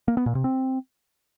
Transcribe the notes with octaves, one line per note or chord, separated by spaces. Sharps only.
A#3
B3
A#2
C3
C4